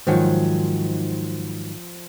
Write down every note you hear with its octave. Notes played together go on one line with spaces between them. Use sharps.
G#2 D#3 F3 F#3 C5